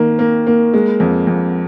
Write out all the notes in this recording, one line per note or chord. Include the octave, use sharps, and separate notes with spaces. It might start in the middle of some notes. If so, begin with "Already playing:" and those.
Already playing: D#3 A#3
A#3
A#3
G#3
F2
F2